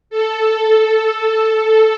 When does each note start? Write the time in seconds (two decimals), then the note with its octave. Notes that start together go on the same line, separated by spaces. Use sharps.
0.10 A4